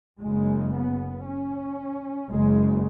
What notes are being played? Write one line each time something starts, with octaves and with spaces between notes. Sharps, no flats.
F#1 F#2 C#3 G#3
B3
C#4
F#1 F#2 C#3 G#3